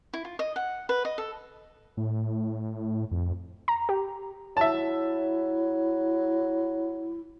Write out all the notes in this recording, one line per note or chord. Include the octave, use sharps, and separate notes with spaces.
E4
F4
D#5
F#5
B4
D#5
A4
A2
F2
A#5
G4
F#3 E4 E5 A5